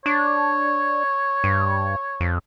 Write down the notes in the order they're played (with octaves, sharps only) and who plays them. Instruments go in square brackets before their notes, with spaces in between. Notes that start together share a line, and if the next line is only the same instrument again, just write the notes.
[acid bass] D4 [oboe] C#5
[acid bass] G2
F2